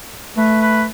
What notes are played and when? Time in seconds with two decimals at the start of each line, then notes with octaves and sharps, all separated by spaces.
0.37 A3 B4
0.61 B4